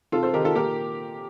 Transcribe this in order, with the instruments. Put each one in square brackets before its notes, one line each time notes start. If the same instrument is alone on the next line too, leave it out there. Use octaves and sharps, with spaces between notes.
[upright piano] C3 F4 A4
A4 C5
D#3 G4 A#4
F4 A4
A#2 G4 A#4